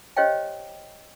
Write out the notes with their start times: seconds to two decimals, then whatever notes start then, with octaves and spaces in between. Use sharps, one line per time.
0.17 G4 C5 C#5 D#5 F5 G5